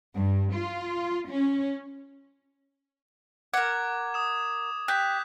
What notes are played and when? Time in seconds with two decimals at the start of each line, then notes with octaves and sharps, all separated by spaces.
0.16 G2
0.54 F4
1.30 C#4
3.54 A#4 F#5 D6 G#6
4.14 D#6 E7
4.88 G4 F#6 G6 B6